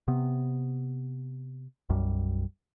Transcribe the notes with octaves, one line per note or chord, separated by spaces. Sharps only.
C3 B3
B1 F#2 G3